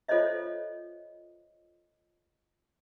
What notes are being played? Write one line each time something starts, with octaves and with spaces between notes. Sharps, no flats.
F4 A4 C5 C#5 D#5 E5